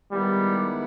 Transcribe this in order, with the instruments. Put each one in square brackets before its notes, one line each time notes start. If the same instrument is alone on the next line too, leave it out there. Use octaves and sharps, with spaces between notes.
[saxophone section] D#3 G#3 B3 E4 [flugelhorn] G3